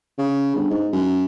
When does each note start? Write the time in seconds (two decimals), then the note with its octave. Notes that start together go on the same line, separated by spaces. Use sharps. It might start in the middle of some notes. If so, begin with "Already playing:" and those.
0.18 C#3
0.55 G1
0.70 G#2
0.92 F#2